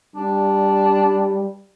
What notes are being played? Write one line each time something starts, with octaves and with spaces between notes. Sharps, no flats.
G3 D4